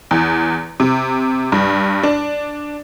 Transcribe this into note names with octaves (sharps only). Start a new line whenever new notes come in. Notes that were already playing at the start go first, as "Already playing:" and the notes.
E2
C3
G2
D4